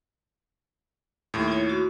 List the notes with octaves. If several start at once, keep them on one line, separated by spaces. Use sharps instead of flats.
D#2 A2
E4 F4 C#5
F#4